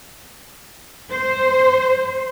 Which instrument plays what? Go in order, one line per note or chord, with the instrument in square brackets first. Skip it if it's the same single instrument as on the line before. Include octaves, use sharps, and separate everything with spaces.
[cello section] C5